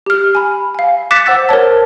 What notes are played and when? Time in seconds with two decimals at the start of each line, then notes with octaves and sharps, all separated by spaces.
0.06 G4 F6
0.35 G#5 B5
0.75 F5 G#5
1.11 D6 F#6 A6 B6 C#7 E7
1.26 C5 F#5 E6 A6
1.49 A#4 C5 C#5 A5